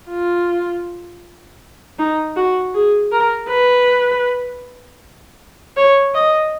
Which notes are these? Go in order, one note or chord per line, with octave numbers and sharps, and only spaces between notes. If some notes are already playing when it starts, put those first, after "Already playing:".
F4
D#4
F#4
G#4
A#4
B4
C#5
D#5